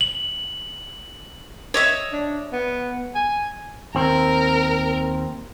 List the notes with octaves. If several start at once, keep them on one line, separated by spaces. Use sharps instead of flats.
F#7
C#5 D#5 E5
D4
B3
G#5
D#2 C4 A#4